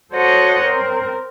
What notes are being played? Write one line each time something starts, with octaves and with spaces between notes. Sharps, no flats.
F#4 A4 C5 C#5 D#5 F#5
C4 A#4